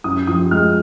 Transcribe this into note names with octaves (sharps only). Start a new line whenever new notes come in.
F#2 D#6
F3 D#6
G#3 F6